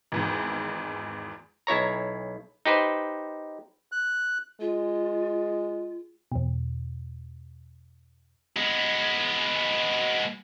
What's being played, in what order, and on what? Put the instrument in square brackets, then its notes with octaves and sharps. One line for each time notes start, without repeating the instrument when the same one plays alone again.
[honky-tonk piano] G#1 E2 G#2
[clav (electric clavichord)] B1 E4 C#5 A#5
D#4 G4 B4 C5
[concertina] F#6
[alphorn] G#3 [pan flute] F4
[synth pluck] E2 B2
[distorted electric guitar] G#3 B3